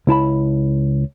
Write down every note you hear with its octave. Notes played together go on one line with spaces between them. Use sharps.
C#2 E4 A5 B5